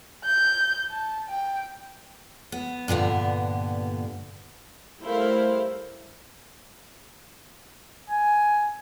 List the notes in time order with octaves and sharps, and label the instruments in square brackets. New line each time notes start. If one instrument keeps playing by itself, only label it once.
[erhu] G6
A5
G5
[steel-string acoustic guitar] B3
G2 A#2 D3 B3
[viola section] G3 A3 E4 A#4 C5 F5
[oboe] G#5